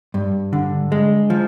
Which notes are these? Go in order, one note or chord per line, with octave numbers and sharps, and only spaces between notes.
G2
D3
G#3
F3